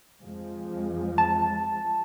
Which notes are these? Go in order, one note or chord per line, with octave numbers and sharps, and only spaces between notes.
F2 F3 G#3
A5